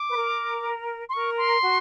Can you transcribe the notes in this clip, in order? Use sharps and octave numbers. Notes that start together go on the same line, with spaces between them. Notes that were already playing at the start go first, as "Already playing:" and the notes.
Already playing: D6
B4
A#4
C6
A#4 C#6
C6
F#4